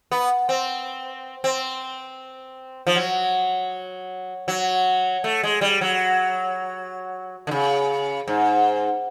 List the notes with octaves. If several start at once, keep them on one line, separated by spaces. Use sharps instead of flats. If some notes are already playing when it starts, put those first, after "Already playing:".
B3
C4
C4
F3
F#3
F#3
A3
G#3
G3
F#3
D3
C#3
G#2